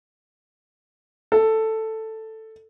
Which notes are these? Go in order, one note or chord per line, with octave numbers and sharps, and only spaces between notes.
A4